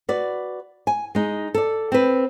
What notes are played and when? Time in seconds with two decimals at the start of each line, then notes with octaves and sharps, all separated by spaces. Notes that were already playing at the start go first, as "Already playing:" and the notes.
0.09 F#4 B4 D5
0.87 G#5
1.15 G#3 D#4
1.54 A4 D5
1.92 C4 B4